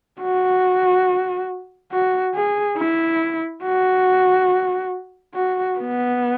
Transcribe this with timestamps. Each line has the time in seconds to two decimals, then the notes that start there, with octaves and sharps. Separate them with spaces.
0.21 F#4
1.92 F#4
2.35 G#4
2.78 E4
3.64 F#4
5.35 F#4
5.78 B3